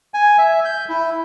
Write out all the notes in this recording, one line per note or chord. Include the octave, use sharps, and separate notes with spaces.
G#5
E5
G6
E4